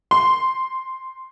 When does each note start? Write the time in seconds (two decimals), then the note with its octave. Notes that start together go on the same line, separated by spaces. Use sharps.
0.11 C6